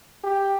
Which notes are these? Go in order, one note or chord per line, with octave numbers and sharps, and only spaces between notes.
G4